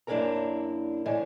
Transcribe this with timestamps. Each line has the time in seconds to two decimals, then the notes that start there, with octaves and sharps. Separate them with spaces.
0.07 F#2 A#3 D4 E4 A#4 A#5
1.06 A2 D3 E3